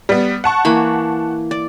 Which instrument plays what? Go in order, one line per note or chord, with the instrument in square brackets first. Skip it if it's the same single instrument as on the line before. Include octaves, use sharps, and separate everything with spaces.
[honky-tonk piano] G3 B3
F#5 A5 C#6
[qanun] E3 A#3 B5
D5